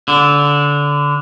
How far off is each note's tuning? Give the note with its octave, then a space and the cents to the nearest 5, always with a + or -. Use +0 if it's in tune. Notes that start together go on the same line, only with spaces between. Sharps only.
D3 -20